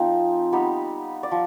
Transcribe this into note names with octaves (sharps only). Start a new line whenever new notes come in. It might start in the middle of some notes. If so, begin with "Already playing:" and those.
Already playing: F3 G#3 C4 D#4 F4
G3 B3 D#4
D5
F3